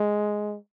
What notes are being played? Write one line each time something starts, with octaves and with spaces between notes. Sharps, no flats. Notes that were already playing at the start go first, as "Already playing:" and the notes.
Already playing: G#3